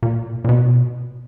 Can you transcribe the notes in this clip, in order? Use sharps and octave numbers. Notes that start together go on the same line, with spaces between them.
A#2
A#2
B2